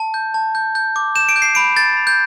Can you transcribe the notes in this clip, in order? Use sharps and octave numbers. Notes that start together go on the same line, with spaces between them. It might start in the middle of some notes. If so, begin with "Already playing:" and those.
Already playing: A5
G6
A5
G6
G6
D6
G6 E7
D7
G6
C7
B5 D7
G6 A6
B5
G6